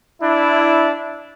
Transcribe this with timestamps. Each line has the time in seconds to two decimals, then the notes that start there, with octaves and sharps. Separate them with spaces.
0.22 D4 E4